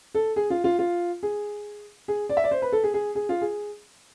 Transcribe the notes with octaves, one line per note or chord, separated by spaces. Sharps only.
A4
G#4
F4
F4
F4
G#4
G#4
D5
E5
D5
C5
B4
A4
G#4
G#4
G#4
F4
G#4